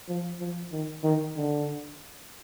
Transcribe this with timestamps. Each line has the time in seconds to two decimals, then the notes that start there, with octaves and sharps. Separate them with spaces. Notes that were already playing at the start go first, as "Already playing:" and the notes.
0.08 F3
0.40 F3
0.72 D#3
1.04 D#3
1.37 D3